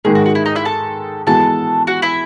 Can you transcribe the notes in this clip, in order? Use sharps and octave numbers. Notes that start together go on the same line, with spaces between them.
G#2 D#3 G#3 G#4
F#4
F#4
E4
D#4 D#5
E4 E5
A4 A5
E3 G#3 B3 F#4 A4 A5
F#4 F#5
E4 E5